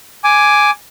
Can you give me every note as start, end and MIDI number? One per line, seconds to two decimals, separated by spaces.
0.24 0.70 80
0.24 0.70 86